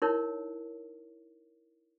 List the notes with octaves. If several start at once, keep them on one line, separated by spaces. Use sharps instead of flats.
D#4 E4 A#4 C#5